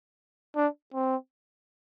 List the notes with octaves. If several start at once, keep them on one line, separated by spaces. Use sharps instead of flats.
D4
C4